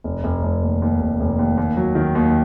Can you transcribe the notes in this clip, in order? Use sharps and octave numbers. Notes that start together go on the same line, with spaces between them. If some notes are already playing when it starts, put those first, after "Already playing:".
F1
F1
F1
D#2
D#2
F1
F1
D#2
D#2
F#3
D#3
D#2